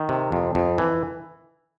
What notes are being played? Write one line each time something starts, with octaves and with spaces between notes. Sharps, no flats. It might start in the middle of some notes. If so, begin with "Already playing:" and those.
Already playing: D#3
C3
F2
F2
E3